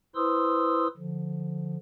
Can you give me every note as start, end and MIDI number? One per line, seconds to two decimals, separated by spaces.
0.15 0.87 64
0.15 0.87 71
0.15 0.87 72
0.15 0.87 84
0.15 0.87 87
0.15 0.87 88
0.97 1.77 50
0.97 1.77 53